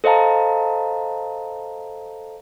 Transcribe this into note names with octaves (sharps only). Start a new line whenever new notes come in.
A4 C5 D#5 F5 A5 A#5